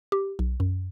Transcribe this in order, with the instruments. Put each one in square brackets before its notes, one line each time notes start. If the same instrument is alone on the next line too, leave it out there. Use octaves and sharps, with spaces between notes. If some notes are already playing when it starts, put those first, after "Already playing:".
[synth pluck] G4
B1
F#2